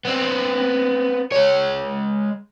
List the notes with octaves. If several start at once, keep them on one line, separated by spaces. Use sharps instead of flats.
B3 C4
G#3 C#5